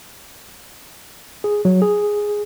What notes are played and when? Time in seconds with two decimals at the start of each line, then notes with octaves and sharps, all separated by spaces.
1.44 G#4
1.65 F#3
1.82 G#4